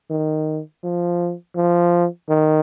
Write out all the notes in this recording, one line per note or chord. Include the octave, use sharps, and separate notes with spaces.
D#3
F3
F3
D#3